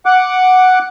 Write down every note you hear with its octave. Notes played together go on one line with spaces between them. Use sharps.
F#5 D6 F#6